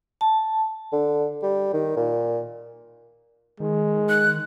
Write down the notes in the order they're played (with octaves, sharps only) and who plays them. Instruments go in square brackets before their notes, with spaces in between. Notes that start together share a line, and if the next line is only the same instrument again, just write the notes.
[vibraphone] A5
[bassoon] D3
G3
D#3
A#2
[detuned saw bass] D#3 [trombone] G#3
[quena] F#6